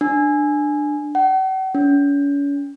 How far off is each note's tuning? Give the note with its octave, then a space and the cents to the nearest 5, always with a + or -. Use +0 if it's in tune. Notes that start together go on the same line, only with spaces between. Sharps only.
D4 +15
F#5 +45
C#4 +40